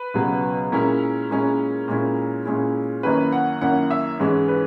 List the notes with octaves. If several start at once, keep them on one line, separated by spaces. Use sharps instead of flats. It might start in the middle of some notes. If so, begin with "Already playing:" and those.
Already playing: B4
C#2 B2 F#3
A#2 G#3 C#4 E4 A#4
A#2 G#3 C#4 E4
A#2 G#3 C#4 E4
A#2 G#3 C#4 E4
F#2 D#3 A#3 C#4 E4 B4
F#5
F#2 D#3 A#3 C#4 E4 F#5
E5
G#2 E3 G#3 C#4 E4
B4